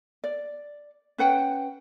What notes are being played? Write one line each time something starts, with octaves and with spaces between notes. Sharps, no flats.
D5
C#4 B4 F#5 G5